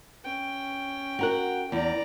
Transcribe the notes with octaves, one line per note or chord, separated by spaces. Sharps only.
C#4 G5
F#4 A#4 F#5
E2 D5 A#5